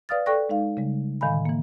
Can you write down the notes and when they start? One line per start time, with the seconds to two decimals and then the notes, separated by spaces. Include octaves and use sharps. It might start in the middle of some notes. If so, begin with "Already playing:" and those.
0.09 B4 D5 F5 D#6 F6 A6
0.26 A4 D5 G5 C#6 F#6 A#6
0.50 G#3 D#4 F5
0.77 C#3 G3 G#3
1.21 A2 D3 D#3 F5 G#5 B5
1.45 E3 A#3